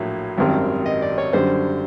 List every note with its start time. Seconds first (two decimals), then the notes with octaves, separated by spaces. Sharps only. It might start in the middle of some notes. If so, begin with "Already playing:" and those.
Already playing: A#1 A2 F#3 A#3
0.37 G#1 F#2 D#3 G3 C4
0.86 D#5
1.02 D5
1.18 C#5
1.33 F#2 D3 G3 C5